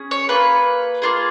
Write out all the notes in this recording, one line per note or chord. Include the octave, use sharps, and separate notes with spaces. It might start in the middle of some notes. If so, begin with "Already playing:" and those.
Already playing: C#4 G#4
C#5
A#3 F4 G#4 B4
A#3 F4 G#4